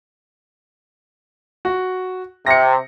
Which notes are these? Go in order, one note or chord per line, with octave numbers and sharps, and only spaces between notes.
F#4
C3 A#6 C#7